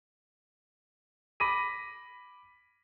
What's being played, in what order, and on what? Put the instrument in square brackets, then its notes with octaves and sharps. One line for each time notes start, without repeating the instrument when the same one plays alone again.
[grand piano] B5 D6 A#6 B6 D#7